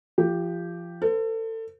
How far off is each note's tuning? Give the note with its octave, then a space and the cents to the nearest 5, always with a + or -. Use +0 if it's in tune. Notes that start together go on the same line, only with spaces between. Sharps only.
F3 -25 G4 +0
A4 +30 C5 -45